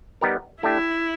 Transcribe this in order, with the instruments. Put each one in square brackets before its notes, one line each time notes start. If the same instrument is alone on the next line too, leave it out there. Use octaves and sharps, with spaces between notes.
[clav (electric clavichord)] G3 B3 D#4 G4 A#4
[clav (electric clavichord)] A3 D4 G4 [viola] E4